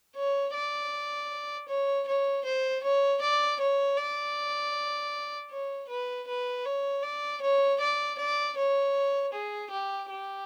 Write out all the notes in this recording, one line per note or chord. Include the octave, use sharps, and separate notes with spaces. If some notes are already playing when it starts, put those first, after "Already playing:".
C#5
D5
C#5
C#5
C5
C#5
D5
C#5
D5
C#5
B4
B4
C#5
D5
C#5
D5
D5
C#5
G#4
G4
G4